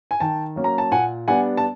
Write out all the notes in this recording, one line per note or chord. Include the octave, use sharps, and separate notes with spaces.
G#5
D#3 G5 A5
F#3 A#3 C#4
A#5
A5
A#2 F#5 G#5
G3 B3 D4 F#5 G#5
A5